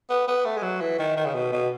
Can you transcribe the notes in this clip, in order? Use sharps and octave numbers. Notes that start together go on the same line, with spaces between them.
B3
B3
A3
G#3
F#3
E3
D#3
D#3
C#3
B2
B2